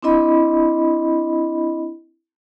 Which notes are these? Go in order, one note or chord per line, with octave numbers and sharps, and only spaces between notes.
C4 D4 E4 D#5 B5